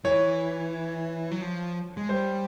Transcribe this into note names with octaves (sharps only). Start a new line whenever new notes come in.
E3 C#5
F#3
F3
G#3
G3 C5